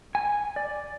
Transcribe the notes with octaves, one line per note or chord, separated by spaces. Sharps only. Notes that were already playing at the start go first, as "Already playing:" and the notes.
G#5
D5